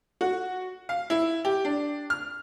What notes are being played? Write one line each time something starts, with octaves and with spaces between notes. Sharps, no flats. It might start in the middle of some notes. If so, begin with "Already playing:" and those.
F#4
F5
E4
G4
D4
F6